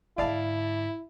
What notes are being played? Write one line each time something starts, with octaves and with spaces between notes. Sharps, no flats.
G#2 D3 E4 D5 F5 A5